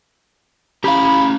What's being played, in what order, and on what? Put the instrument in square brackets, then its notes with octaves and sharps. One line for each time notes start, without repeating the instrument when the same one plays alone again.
[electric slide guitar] C#4 E4 A#5 [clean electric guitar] G4 F5 [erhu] B5